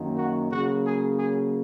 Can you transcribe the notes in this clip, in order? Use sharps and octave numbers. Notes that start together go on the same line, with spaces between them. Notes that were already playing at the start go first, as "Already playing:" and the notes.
Already playing: F#2 D#3 A#3
F#4
C#3 F#3 A#3 F#4
G#4
G#4